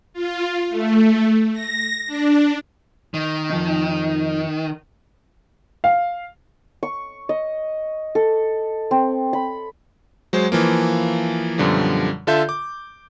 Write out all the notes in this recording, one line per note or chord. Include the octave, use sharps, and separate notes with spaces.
F4
A3
A#6
D4
D#3
F2 F3 D#4
F5
C#6
D#5
A4
C4
B5
F#3 G#3 C5
E3 F3 A#3
F#2 B2 D3 F3 G3
D3 F4 A4 E5 G6
D6